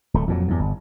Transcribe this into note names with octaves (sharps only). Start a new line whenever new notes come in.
D1 A3
F2 A#2 F#3
E2 G2
G1